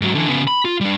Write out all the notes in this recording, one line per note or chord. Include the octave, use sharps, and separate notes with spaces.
G#2 F#3
D3 E3
C#3 B3
B5
F4
G3 D4